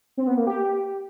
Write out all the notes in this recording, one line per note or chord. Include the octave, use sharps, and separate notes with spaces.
C4
B3
A#3
G4